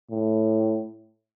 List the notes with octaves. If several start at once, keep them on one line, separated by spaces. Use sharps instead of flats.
A2